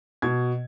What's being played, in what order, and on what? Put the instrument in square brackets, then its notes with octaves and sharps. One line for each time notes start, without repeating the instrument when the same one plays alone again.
[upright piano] B2 G#6